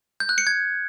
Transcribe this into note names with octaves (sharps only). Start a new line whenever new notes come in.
G6
F#6
C#7
G#6